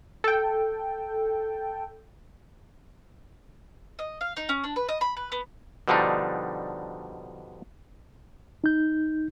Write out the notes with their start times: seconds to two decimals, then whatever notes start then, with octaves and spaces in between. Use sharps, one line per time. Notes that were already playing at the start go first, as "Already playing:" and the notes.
0.24 A4 G5
3.99 D#5
4.21 F5
4.37 D#4
4.49 C#4
4.64 D4
4.76 B4
4.89 D#5
5.01 B5
5.17 B4
5.32 B3
5.88 B2 D3 F3 G3 D4 D#4
8.64 D#4 G6